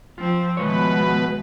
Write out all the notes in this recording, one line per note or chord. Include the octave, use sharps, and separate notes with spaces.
F3 C4 F4
B2 D#3 F3 G#3 A3 B4 C#5